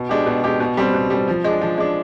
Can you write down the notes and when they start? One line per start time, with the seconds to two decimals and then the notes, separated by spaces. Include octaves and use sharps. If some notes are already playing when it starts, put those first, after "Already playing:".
Already playing: B2
0.09 G#3 D4 G4
0.26 B2
0.43 G#3 D4 G4
0.60 B2
0.77 G3 C4
0.94 B2
1.10 G3 C4
1.28 F3
1.44 G#3 D4
1.61 F3
1.78 G#3 D4